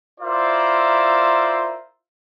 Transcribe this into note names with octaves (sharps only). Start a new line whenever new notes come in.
E4 F4 A#4 C5 D5 E5